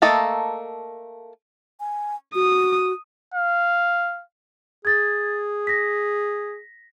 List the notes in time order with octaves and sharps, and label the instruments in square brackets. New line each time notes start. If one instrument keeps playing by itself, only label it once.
[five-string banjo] A3 A#3 A4 D#5
[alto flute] G#5
[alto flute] F#4 [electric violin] D#6
[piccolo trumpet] F5
[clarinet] G#4 [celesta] G#6 A6
[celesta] A#6 B6